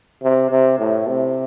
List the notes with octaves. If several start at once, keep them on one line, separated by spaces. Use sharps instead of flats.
C3
C3
A2
C3